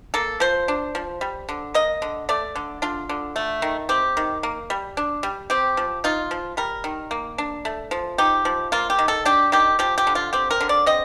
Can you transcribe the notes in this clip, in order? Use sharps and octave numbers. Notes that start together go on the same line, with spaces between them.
A#3 A4
F3 C5
D4
F3
G3
D3
A#3 D#5
D3
A3 D5
D3
D4 F4
D3
A3
D#3
C4 G4
D#3
A#3
G3
D4
G3
C4 G4
F3
D#4 F4
F3
G3 A#4
D#3
A#3
D4
A3
F3
D#4 G4
F3
A#3 F4
G4
D#3
A4
D4 G4
D#3 G4
F3 G4
G4
D3
F4
C4 G4
A#4
D3
D5
C4 D#5